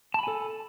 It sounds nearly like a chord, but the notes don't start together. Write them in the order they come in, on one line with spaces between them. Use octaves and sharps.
A5 B5 G#5 A4